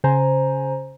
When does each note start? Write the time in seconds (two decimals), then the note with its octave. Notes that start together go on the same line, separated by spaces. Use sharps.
0.04 C#3 C5 G#5 A#5